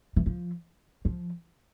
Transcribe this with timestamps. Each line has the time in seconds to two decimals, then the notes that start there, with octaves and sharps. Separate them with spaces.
0.16 E3
0.26 F3
1.05 F3